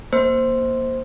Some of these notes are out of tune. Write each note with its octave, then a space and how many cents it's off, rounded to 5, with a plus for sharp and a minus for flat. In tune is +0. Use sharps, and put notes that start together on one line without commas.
A#3 +10 C5 +0